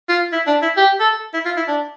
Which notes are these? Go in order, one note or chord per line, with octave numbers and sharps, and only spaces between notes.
F4
E4
D4
E4
G4
A4
E4
F4
E4
D4